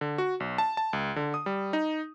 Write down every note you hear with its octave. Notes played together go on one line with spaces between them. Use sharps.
D3
F#4
B1
A5
A5
C#2
D3
D#6
G3
D#4